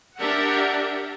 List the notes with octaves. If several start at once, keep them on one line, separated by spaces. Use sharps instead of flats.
D4 G4 A#4 E5 F#5